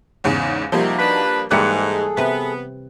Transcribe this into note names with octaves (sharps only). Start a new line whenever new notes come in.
E2 G#2 C#3
C3 F3 G3 A#3 D#4 F#4
D4 B4
G#2 E3 G3 A#3 G#4 A4 F#6 C#7
C3 B3 B4